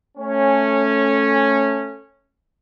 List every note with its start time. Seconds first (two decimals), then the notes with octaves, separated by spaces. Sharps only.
0.18 A3 C#4